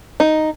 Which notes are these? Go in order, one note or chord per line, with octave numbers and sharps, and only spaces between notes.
D#4